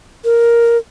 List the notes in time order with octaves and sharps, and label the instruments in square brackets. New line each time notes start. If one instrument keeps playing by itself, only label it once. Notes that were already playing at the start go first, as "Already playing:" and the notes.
[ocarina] A#4